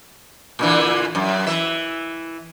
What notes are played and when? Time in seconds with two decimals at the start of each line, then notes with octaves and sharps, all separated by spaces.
0.59 A#2 D3 E3
1.15 F#2
1.46 E3 E5